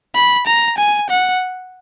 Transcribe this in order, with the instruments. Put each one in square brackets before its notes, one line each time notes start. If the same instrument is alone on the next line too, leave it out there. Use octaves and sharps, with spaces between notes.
[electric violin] B5
A#5
G#5
F#5